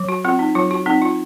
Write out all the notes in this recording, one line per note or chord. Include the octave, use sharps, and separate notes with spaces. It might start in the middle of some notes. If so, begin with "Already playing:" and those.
Already playing: F#3
F#4
C4 F4
D#4
F#3 F4
F#4
C4 D#4
F4